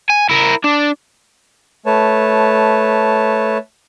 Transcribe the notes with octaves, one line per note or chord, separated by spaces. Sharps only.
G#5
E4 A#4
D4
A3 B4 C#5 A5